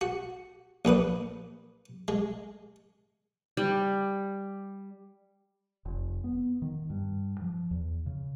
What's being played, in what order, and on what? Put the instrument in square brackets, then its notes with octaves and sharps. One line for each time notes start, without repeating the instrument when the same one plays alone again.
[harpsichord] F#4
A#1 A#2 B4 D#6
G#3
[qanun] G3
[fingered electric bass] F1
B3
D#3
G2
F3
E2
C#3